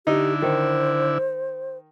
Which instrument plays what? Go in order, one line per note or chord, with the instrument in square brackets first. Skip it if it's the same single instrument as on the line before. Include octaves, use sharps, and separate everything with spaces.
[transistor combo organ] D3 E4 [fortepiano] D#4 [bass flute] G4
[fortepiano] D#3 [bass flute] C5